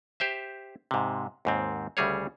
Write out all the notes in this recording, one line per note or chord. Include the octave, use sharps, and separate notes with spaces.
G4 C5 E5
G#2 C3
D#2 G#2 C4
D2 C#3 G3 G#4 C#5